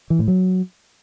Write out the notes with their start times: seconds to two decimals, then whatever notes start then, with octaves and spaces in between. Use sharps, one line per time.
0.10 E3
0.19 A2
0.28 F#3